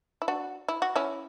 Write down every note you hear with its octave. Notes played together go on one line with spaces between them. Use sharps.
E4
D4 F#4
E4
F#4
C#4 E4